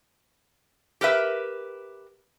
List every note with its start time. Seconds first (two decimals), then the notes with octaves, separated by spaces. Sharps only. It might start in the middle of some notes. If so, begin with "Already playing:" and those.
1.01 G4 A#4 B4 E5